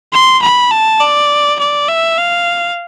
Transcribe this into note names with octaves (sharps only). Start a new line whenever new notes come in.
C6
B5
A5
D5
D5
E5
F5